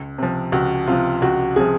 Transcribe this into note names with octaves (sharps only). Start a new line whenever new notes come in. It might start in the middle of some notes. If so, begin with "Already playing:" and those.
Already playing: C#2
C3 F3
C#2 F#4
C3 F3 F4
C#2 F#4
C3 F3 G#4